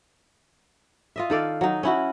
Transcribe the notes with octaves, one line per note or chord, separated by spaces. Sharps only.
F4 D#5 E5
D#3 A4 D5 F5
F#3 D#4
C#4 E4 F#4